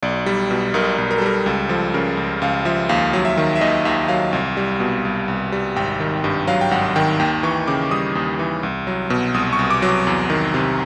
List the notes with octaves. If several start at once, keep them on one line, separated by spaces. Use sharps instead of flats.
B1 D5
G3
B2
B1 A#4
B1
A#4
A4
G3 A#4
C#2 A4
F3 A4
C#3 A#4
C#2
C#2 F5
F3 E5
D#2 F5
F#3
E5
D#3
E5
D#2 D#5
D#2 E5
F#3 F5
C2
G3
B2
C2
C2
G3
G#1 G5
D#3
G2
F#3 F5
G5
G#1 F#5
D#3 G5
D#2 G5
E3 C#6
C#3 D6
G3 D#6
D#2
E3
C2
F#3
B2
C2 D#6
C#6
C2
D6
F#3
D6
E2
D#3
C3